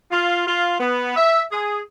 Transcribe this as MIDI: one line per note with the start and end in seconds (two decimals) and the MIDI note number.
0.11 0.44 65
0.47 0.78 65
0.80 1.13 59
1.16 1.43 76
1.52 1.80 68